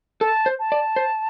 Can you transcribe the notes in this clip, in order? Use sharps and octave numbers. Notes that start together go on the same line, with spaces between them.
A4 A5
C5
A5
D5
C5